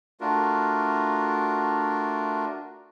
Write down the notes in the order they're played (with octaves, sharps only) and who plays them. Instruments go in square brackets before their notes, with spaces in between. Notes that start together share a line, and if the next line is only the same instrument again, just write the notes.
[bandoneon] A3 D4 F4 F#4 A#4